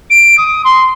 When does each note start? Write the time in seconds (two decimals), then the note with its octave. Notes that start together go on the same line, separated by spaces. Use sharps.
0.10 D7
0.37 D#6
0.64 C6